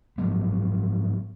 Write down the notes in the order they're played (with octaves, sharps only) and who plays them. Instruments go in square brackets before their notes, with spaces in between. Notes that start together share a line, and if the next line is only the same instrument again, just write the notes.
[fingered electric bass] G#2 F3 F#3 B3